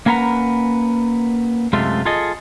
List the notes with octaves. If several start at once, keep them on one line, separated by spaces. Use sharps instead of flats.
A#3 C#4 A#4 B4 F#5 A#5
F#2 C3 G#3 A3 F4
F4 G#4 A4 D#5